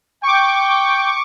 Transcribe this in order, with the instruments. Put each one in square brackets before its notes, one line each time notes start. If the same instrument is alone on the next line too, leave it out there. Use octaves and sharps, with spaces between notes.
[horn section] G5 [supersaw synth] C#6 D6